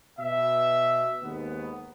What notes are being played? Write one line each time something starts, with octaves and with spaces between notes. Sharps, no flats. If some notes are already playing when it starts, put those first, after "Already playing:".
B2 E5
D#2 G#2 D#3 B3